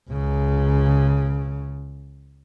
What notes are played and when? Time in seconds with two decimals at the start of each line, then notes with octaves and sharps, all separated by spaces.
0.10 C#2 C#3